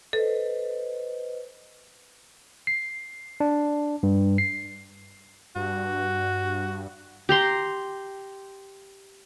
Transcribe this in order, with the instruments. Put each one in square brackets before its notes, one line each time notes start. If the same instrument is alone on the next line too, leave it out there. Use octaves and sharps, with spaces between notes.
[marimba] A4 [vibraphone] B4 C5 D#5
[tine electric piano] C7
D4
G2
C7
[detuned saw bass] G2 [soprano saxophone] F#4
[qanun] G4 A#5 C6